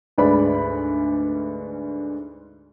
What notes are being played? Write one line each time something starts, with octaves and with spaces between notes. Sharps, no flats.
D2 G#2 B4 D5 B5